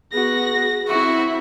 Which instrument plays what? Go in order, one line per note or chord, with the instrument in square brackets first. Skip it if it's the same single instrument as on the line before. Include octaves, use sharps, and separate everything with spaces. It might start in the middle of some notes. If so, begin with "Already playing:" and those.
[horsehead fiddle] B3 [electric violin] F#4 A#6 [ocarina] G#4
[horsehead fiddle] C4 E4 [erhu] F#4 [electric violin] E5